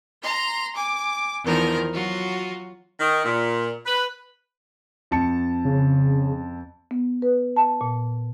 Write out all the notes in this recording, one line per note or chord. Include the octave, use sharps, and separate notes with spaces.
A#5 C6
G#5 D6
E2 D#3 F3 A#4
F#3 F4 F#4
D#3
A#2
B4
F2 A5 C#7
C#3
B3
B4
A5
A#2